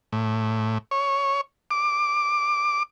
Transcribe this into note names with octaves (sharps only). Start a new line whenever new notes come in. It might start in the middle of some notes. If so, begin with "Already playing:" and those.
A2
C#5
D6